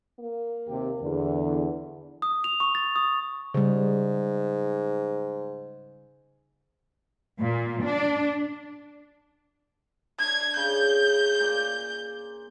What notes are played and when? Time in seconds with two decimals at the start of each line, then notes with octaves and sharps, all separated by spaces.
0.20 A#3
0.68 D#2 C3 G4
1.02 E2 D3
2.22 D#6
2.44 F7
2.60 C#6
2.75 A6
2.96 D#6
3.54 G#2 C#3 G3
7.40 A#2
7.83 D4
10.19 D4 G#6
10.56 C#3 G6
11.40 A#2 G#4 D5